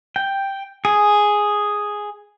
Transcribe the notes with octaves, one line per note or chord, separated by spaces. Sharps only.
G5
G#4